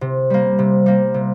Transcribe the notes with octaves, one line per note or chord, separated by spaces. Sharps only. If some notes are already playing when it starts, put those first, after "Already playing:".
C3
G3 A#3
C3
G3 A#3
C3